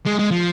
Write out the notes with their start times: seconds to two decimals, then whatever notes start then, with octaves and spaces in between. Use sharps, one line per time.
0.06 G#3
0.19 G#3
0.31 F3